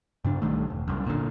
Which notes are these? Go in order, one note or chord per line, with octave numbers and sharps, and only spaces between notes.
G2 C#3 D4
B1 G2 D#3 A3
E1
F#1 C2 F#2
A#2 D3